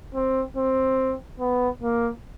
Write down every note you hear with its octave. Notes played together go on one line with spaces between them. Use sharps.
C4
C4
B3
A#3